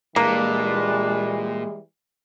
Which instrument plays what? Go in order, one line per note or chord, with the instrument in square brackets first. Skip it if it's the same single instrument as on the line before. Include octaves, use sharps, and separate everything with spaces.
[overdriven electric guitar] A#2 [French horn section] E3 G3 G#3 [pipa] A#3 [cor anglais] D4